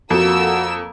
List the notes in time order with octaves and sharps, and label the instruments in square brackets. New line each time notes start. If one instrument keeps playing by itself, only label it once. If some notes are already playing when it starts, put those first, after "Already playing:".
[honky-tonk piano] F2 A4 [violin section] A#3 E6 [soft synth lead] F#4